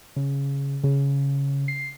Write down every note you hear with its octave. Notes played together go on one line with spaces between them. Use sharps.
C#3
C#3
C7